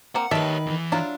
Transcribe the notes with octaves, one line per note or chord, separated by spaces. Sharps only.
A#3 C4 F#5
D#3 G4 B4 C#5 E5 A5
E2 E3
F#3 D4 E4 F4